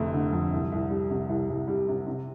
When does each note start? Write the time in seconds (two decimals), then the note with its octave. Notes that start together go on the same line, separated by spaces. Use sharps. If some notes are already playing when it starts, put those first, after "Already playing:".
Already playing: F1 F2 D3 A3
0.13 D3
0.32 F2
0.53 C2
0.72 C2
0.90 G3
1.10 C3
1.29 C2
1.49 C2
1.68 G3
1.88 C3
2.07 C3